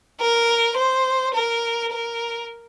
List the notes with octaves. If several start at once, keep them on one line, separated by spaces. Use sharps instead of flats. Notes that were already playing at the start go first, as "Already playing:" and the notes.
A#4
C5
A#4
A#4